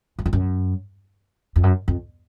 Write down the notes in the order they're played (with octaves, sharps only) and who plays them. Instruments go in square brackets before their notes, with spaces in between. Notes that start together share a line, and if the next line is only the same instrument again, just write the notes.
[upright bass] F#2
F2
F#2
F2
F#2
F2